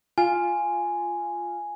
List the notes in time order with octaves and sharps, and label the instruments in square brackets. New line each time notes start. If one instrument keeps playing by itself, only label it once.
[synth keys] F4 [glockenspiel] G#5